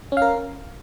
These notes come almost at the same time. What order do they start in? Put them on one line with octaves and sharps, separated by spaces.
C#4 F5 A#4